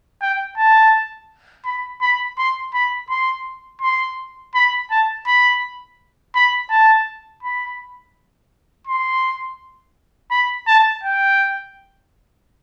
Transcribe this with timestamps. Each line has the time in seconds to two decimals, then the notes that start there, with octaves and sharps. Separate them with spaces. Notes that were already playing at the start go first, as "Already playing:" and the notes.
0.22 G5
0.58 A5
1.65 B5
2.01 B5
2.38 C6
2.74 B5
3.10 C6
3.82 C6
4.55 B5
4.91 A5
5.27 B5
6.35 B5
6.70 A5
7.43 B5
8.87 C6
10.31 B5
10.67 A5
11.03 G5